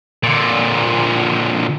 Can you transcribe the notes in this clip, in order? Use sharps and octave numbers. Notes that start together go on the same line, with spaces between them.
A#2 D3